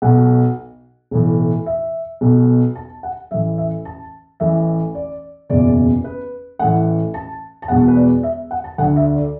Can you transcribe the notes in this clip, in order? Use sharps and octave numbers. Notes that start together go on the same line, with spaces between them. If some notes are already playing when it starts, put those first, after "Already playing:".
B1 B2 F#5
B1 A2 E3
E5
B1 B2
A5
F#5
A1 A2 E3 E5
E5
A5
A1 A2 E3 E5
D5
F#1 E2 B2 D5
B4
A1 A2 E3 F#5
A5
A5
E1 E2 B2 F#5
B4
D5
E5
F#5
A5
D2 D3 F#5
E5
D5